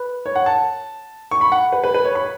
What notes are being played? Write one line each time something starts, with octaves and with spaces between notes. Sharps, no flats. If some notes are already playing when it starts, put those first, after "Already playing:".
Already playing: B4
C#5
F#5
A5
C#6
B5
F#5
B4
B4
B4
C#5
B5